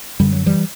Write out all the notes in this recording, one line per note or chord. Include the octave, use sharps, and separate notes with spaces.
F#2 D3 G3
F#3
E3 G3